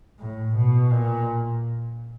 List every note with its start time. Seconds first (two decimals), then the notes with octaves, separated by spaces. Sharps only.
0.20 A2
0.56 B2
0.92 A#2